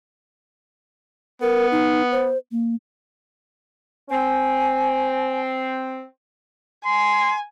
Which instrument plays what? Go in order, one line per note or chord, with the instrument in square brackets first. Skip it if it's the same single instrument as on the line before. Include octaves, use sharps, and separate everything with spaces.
[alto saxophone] B3 [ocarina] A#4
[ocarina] D#4
C5
A#3
[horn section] C4 [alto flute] G#5
[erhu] G#5 [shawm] C6